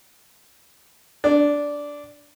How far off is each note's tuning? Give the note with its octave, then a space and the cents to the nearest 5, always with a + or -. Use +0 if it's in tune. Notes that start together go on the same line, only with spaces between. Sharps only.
D4 -10